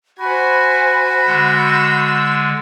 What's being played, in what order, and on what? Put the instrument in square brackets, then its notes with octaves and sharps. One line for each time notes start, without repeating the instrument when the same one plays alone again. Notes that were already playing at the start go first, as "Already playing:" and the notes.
[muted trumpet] F#4 [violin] C5 G#5 [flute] B5
[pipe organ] D3 G#3 [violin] E6 G6